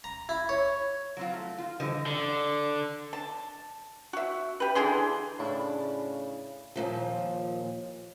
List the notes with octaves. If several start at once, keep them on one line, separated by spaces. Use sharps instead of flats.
A#5
E4
C#5
F#3 C4 F4
A3
F4
D3 E3 G3 C5 D#5
D3
A5
F#4 E5
G4 B4
D3 E3 G#4 C6
A2 C#3 D4 E4
D#2 A#2 F3